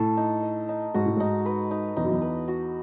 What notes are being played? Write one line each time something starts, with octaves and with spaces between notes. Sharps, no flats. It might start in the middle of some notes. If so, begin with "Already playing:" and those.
Already playing: A2 A4
D#4
D#5
D#4
G#2 F#4
A2
G#2 D#4
B4
D#4
E2 D#4
F#2
E2
B4
F#4